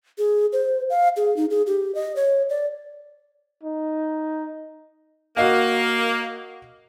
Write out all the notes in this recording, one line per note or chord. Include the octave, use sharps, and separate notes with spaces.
G#4
C5
F5
G#4
D#4
G#4
G4
D#5
C#5
D5
D#4
A#3 F#4 D#5 F5